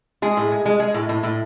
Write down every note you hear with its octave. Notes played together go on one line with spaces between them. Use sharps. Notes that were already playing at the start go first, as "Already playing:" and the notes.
G#3 G#4
A2
G#3
G#3
G#3
A2
A2
A2